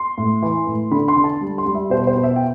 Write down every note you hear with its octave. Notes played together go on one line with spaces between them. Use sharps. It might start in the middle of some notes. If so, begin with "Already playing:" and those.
Already playing: C6
A2
E3
A2
D3 B5
C6
D3
A5
G3
C6
G3
E5
B2 C5
C5
B2
E5
G5